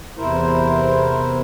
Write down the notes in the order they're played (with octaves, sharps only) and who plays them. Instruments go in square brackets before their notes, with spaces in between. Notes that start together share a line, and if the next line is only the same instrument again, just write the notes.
[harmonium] E2 C3 E4 A#4 C5